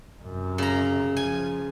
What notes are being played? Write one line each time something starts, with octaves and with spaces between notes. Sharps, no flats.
F#2 C3
C#3 A#5
F3 G#5